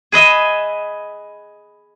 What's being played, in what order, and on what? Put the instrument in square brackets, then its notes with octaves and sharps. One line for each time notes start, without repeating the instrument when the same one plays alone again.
[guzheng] G#4 B4 D#5 E5